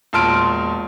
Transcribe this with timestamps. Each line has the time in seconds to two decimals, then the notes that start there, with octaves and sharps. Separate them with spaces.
0.13 E1 A#2 A5 C6 F6 D7